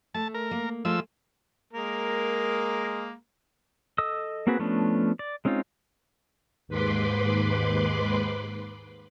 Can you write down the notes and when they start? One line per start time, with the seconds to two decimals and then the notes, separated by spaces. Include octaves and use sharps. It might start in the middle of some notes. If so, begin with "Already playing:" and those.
0.14 A3 A5
0.34 A#4
0.51 A#3
0.85 F3 G#3 A3 E6
1.73 G#3 A#3 A#4
3.98 A4 D#5 D#6 E6
4.47 A#3 C4 F#4 G#4 B4
4.59 F3 A3 B3 C#4 D4
5.19 D5
5.45 G#3 C4 C#4 D#4 F4
6.68 D#2 G#2 B4 B5 C6 D6